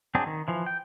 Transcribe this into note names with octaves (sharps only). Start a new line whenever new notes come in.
F#3 C4 D4 G#4
D#3
E3 F3
G5